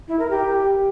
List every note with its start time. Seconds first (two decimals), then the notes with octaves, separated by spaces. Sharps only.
0.08 E4
0.19 A#4
0.30 G4